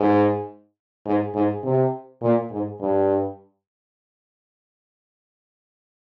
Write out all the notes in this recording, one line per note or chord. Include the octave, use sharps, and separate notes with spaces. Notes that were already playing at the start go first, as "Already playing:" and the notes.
Already playing: G#2
G#2
G#2
C3
A#2
G#2
G2